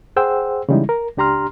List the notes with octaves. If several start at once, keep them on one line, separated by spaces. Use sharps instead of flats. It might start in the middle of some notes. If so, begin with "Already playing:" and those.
G#4 C5 F#5 G5 E6
C#3 E3 G3 G#3 D#4 E4
A#4
C#2 D4 G4 A#5 C6 F6